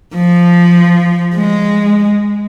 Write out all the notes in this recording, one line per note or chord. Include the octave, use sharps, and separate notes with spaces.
F3
G#3